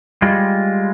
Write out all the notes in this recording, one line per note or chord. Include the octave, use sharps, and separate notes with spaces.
G3 G#3 F4